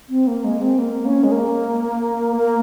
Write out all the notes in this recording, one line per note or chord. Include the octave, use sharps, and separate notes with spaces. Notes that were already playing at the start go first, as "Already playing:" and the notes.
C4
A#3
G#3
C4
A#3
C#4
G#3
A#3
A#3